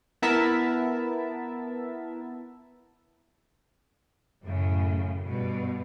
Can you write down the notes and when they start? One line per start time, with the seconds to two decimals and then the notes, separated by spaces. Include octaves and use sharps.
0.22 B3 E4 A#4 E5 A5
4.45 F#2 A2 C#3
5.26 G2 B2